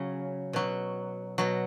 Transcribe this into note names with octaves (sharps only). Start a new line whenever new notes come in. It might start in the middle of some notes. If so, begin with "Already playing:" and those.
Already playing: C#3 F#3
B2 F#3
B2 F#3